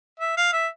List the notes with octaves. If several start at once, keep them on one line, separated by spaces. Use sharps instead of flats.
E5
F5
E5